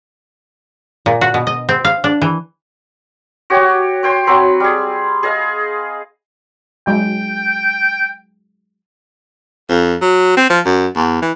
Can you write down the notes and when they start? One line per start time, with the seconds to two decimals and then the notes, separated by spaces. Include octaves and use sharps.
1.06 A#2
1.21 F#4
1.34 B2
1.47 D#5
1.69 C4
1.85 F5
2.04 D4
2.22 E3
3.50 F#4 G4 C#5
4.03 C#5 G5 C6
4.27 F#3 C4 B5
4.60 G3 G#4
5.23 G#4 D#5 F5
6.87 F#3 G#3 G5
9.69 F2
10.02 F#3
10.37 C4
10.50 F3
10.66 F#2
10.96 E2
11.22 E3